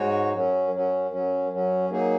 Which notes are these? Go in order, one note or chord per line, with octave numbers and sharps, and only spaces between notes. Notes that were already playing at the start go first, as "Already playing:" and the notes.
Already playing: G#2 G#3 D#4 F#4 C#5
F#2 F#3 C#4
F#2 F#3 C#4
F#2 F#3 C#4
F#2 F#3 C#4
F#3 A#3 D#4 G#4